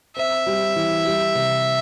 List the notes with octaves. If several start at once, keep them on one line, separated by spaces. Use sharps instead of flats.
C4 E5
G3
E3
G3
C3